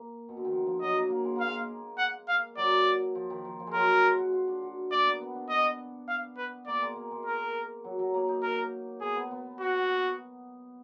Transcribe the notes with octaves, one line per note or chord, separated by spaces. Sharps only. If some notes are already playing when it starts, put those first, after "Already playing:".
Already playing: A#3
B2
D3
D#3
F3
F3
F#3 D#5
A#3
A#3
G#3
A#3 F5
G#3
F#5
F5
F#3 D5
F3
D#3
F3
F3
G#3
F#3 A#4
G#3
F#4
F4
D4
F#4
A#3 D5
B3
B3
D4
B3 D#5
F5
B4
A#3 D5
G#3
A#3
G#3
A#4
F#3
F#3
A#3
D#4
A#4
B3 G#4
B3
B3
F#4